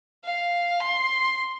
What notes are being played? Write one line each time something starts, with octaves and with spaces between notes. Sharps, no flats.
F5
C6